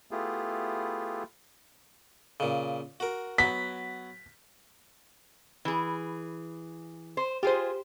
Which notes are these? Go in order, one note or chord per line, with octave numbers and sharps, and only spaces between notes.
A3 B3 E4 F4 G4 G#4
A#2 C#3
F#4 A#4
F#3 B3 B6
E3 G#4
C5
F4 G4 G#4 C5